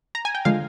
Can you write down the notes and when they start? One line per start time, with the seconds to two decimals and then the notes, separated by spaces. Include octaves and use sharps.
0.15 A#5
0.25 G#5
0.35 G5
0.45 D3 F3 G#3 F5